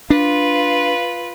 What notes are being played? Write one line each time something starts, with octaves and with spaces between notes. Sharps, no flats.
D4 F4 B4